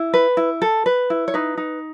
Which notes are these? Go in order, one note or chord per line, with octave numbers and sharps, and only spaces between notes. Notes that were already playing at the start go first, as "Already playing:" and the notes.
Already playing: E4
B4
E4
A4
B4
E4
C#5
D#4 B4
D#4